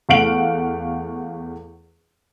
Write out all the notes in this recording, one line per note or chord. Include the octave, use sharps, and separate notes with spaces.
E2 A3 F5 F#5 D7 F#7